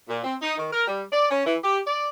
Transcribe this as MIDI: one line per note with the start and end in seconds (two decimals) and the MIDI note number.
0.08 0.21 46
0.24 0.35 60
0.41 0.57 63
0.58 0.67 51
0.72 0.85 70
0.87 1.02 55
1.12 1.26 74
1.30 1.42 61
1.45 1.56 52
1.63 1.78 67
1.86 2.08 74